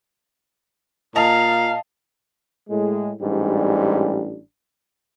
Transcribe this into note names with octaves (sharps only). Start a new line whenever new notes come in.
A#2 D#5 F5 A5 A#5 F7
A2 G#3
A1 G#2 G3 D4